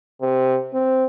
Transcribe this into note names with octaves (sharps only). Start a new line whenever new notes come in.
C3
C4